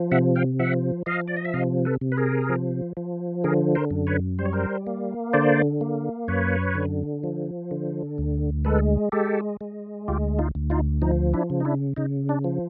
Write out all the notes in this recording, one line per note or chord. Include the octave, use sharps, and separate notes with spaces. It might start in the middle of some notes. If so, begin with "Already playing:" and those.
Already playing: F3
C3 E5 F#5
F5 G5
F3 E5 F#5
F3 D#5 F5
D5
D#5
E5
C3 D#5 F5
A4 B4
C3
B4
G#4 A#4
F3
F3
D3 G#4 A#4
A#4 C5
F#2
B4 C#5
G3 C5
C#5
A#4 C5
A#3
D3 C5 D5
A#3
F#2 B4 C#5
D3
F3
D3
D2
G#3 A4 B4
G#3 G4 A4
G#3
D2 F4 G4
D#4 F4
D2
D#4 F4
F3 D#4
D4 E4
C#3
D#4
D4 E4
C#3 D#4
D4
F3